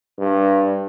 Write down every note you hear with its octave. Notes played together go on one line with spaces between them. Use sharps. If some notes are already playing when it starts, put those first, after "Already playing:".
G2